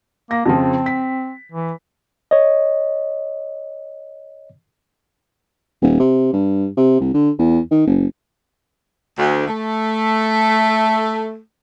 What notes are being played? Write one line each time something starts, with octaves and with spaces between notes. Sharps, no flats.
A#3 A#6
F2 C#3 F3 C4
B6
E3
C#5 D#5
D#1
C3
G2
C3
C2
D3
E2
D#3
F#1
D2
A3